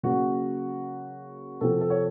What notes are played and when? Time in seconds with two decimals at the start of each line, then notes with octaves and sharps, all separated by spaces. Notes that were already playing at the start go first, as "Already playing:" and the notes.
0.03 C#3 F#3 A#3 F#4
1.61 C3 F3 C4 A4
1.81 A4
1.90 C#5